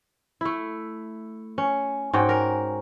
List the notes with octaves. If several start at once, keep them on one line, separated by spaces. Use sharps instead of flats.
A3 E4
C#4
G#2 C#4 F#4 G5
A#4